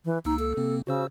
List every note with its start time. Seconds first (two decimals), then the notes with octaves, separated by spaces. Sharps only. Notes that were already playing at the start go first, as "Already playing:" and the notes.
0.05 E3
0.25 C#2 A#3 D#4 E6
0.39 A4
0.57 C3 A#3 C4
0.87 C#3 F#4 C5 E6